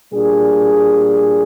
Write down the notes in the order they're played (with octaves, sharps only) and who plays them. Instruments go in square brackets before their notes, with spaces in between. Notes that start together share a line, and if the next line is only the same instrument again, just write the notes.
[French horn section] A#2 G3 D4 G#4